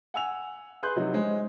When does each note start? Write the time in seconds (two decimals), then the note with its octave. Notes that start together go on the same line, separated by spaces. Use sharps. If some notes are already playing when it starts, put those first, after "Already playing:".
0.14 F#5 G#5 E6 F7
0.83 G#4 B4 C6 F#6 G6
0.96 C3 F#3 D#4
1.14 G#3 C#4 C5